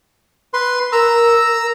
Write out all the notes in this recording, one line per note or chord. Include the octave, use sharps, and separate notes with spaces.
B4 C6
A#4 A#5 E6